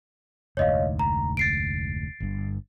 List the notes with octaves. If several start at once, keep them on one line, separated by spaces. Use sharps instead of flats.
F1 D2 G#2 C#5 D#5 F5
A#5
A6 C7 D7
G1 G2